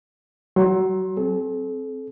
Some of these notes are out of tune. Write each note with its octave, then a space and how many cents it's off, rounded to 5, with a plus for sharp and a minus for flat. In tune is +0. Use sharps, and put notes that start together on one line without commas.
F#3 +25 C6 +30
C4 +10 A4 -35